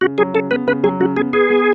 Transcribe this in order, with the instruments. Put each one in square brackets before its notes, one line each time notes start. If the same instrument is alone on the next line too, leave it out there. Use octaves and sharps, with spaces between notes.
[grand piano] C#3 [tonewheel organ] F#4
[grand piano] F#3 [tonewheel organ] G#4
[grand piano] C#3 [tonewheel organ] A4
[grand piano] B3 [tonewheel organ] B4
[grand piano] C#3 [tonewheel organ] B4
[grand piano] F#3 [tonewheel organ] G#4
[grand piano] C#3 [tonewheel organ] F#4
[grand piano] B3 [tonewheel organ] G#4
[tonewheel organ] G#4 [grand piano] B4
[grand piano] B3